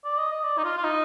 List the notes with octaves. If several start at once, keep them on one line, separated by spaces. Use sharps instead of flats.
D5
D#5
D#5
D5
D#4
F4
F4
D#4